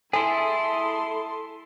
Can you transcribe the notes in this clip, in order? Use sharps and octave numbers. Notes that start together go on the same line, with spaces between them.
E4 G#4 A4 E5 G#5 A5 C6